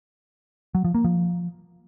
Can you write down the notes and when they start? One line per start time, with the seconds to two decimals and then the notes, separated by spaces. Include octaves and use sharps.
0.75 F#3
0.85 F3
0.95 A#3
1.04 F3